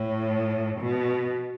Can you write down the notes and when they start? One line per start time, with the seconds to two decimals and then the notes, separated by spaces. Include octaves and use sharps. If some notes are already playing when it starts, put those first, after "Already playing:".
Already playing: A2
0.81 B2